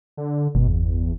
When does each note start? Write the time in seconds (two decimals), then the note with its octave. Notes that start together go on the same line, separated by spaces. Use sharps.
0.17 D3
0.55 G1 B2
0.68 E2